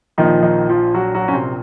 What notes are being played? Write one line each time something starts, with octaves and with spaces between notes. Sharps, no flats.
A#1 A#2 D#3 F3 D#4
D#3 D#4
F3 F4
F#3 F#4
F#3 F#4
C#4
C3 C4